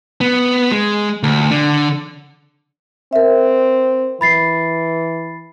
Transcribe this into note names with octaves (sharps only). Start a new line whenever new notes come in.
B3
G#3
D2
D3
C4 A#4 E5
E3 B5 A6 C7